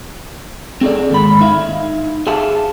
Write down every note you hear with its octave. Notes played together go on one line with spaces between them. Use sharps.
C4 G#4 A4 D5
D#2 G#2 B5
D#4 E5 F5
G#4 E5 F5 A5